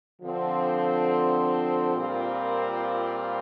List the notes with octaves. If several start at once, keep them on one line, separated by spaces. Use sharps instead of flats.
D3 F3 C4
A#2 G3 C4 F4 A#4